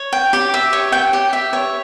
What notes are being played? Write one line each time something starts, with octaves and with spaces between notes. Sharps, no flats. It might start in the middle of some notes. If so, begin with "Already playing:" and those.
Already playing: C#5
G5
G4
E5
C#5
G5
G4
E5
C#5